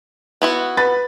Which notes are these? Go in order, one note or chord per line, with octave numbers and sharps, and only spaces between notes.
B3 E4 F#4
B4 A6